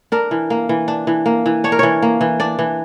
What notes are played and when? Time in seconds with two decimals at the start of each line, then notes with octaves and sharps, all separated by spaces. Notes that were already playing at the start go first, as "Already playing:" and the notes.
0.12 D4 A#4
0.31 E3
0.50 A#3
0.69 E3
0.88 D4
1.07 E3
1.26 A#3
1.46 E3
1.64 D4 C#5
1.72 A#4
1.79 E3 C#5
2.02 A#3
2.21 E3
2.40 D4 D5
2.59 E3